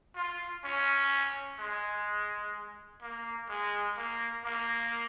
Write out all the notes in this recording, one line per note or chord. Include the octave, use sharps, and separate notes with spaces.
F4
C#4
G#3
A#3
G#3
A#3
A#3